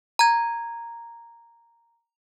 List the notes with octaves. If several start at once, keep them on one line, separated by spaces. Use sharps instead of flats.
A#5 G#6